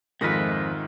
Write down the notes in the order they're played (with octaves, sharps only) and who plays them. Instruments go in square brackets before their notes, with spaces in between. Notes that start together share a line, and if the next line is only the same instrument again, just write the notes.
[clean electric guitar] F2 B4 [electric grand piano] G#2 D#3 A#6 [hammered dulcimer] G#3 F4 E5